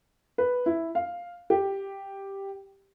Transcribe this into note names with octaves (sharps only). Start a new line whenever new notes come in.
B4
E4
F5
G4